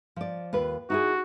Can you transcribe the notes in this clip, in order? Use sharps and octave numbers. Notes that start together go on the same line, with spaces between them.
F3 D5
D#2 F4 B4
D#4 E4 F#4 G#4